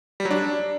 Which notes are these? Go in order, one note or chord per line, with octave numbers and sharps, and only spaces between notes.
G3
F#3
D4